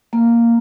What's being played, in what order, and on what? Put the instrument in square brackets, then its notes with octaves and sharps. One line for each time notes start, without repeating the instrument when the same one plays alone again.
[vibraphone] A#3